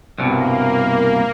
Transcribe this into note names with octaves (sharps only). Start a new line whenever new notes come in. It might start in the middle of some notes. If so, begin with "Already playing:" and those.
C2 G2 B2 A#3